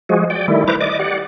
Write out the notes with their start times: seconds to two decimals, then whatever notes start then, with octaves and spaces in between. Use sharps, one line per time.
0.09 F3 G#3 F#4 G#4
0.30 D5 G5
0.48 D#3 G3 A3 E4
0.68 E4 B4 C5 A#5 D6
0.81 D5 D#5 D6
0.99 G4 D5 F#5